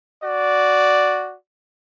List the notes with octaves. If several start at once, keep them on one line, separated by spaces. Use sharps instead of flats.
F#4 D5